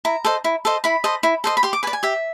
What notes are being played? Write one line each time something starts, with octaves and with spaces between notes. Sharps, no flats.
E4 A#5
A4 C5 D#5
E4
A4 C5 D#5
E4 B5
A4 C5 D#5
E4
A4 C5 D#5
B5
G4 C6
D6
B4 D5 G#5
G#5
G4 E5